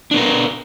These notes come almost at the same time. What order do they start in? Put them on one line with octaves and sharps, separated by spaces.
D4 B3 A#4